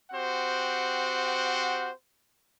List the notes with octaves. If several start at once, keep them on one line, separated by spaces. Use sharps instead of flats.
C4 F#4 G4 C5 F#5